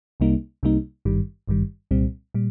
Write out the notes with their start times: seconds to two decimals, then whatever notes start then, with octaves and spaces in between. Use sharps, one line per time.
0.20 C2 C3 G3 A#3 D#4
0.63 C2 C3 G3 A#3 D#4
1.05 G#1 G2 D#3 G3
1.48 G#1 G2 D#3 G3
1.91 C2 A#2 G3 C4
2.34 A#2 G3